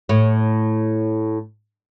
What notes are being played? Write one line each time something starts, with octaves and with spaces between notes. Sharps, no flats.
A2 C#5